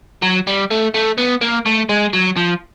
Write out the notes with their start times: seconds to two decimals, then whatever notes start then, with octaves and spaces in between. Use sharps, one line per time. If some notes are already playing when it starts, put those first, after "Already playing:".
0.23 F#3
0.47 G3
0.71 A3
0.94 A3
1.18 B3
1.41 A#3
1.66 A3
1.89 G#3
2.13 F#3
2.37 F3